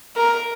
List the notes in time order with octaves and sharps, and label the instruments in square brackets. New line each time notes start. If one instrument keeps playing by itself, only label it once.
[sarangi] A#4